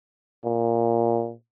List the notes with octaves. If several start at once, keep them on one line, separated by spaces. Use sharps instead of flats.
A#2